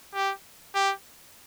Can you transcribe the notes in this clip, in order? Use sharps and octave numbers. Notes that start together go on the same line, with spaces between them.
G4
G4